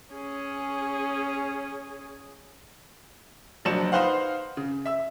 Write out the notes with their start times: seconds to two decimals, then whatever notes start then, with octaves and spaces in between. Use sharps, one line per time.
0.14 C#4 G#4
3.65 F#1 F3 F#3 D4 C#7 E7
3.92 D#4 B4 C5 F5 F#5
4.57 C#3
4.86 E5 E6